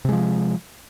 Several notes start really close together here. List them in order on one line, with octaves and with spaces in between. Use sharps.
C3 G#3 F3